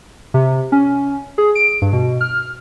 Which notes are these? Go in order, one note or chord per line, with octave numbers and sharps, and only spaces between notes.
C3
C#4
G#4
D7
G2
B2
F6